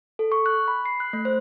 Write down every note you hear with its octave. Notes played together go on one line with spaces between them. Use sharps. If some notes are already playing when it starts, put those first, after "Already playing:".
A4
C#6
F#6
B5
C7
F#6
A3
C5